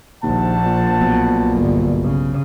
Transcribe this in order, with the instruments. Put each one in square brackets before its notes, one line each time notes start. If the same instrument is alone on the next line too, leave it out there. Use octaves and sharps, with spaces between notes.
[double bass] A#1 [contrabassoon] D#2 [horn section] C5 F#5 A5
[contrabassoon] A#2
[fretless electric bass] B1 B2
[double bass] G1 D3
C#3